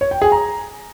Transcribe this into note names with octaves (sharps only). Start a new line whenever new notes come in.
C#5
G5
G#4
A#5